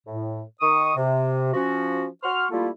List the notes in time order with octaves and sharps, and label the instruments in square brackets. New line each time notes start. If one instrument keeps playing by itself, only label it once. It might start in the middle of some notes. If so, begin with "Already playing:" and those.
[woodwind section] A2
D#3 C#6 D#6
C3
F3 C#4 F#4
F#4 C6 C#6 F6
G3 A3 A#3 E4 F4